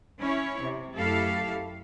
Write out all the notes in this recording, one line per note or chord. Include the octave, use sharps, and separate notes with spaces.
C#4 E4 C#5
C3
F#2 A3 E4 G4 A4 F5